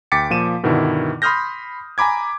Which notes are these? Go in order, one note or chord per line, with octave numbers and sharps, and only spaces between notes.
D2 G5 D6 A6 B6 C#7
A#2 F3 D#7 E7
G2 B2 D3 D#3 E4
B5 C6 D#6 F6 G6 A#6
G#5 A#5 B5 D6 G#6